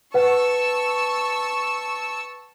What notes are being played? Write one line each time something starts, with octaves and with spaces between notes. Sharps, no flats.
B4 F#5 A5 C#6 E6